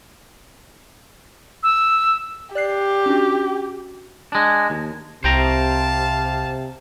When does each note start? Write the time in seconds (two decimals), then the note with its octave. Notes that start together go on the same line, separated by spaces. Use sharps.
1.63 E6
2.55 G4 D5 F#6 C7
3.06 C#4 D4 F#4
4.32 G#3 D4
4.70 D#2
5.24 C2 C3 C5 F5 G5 A5 A#5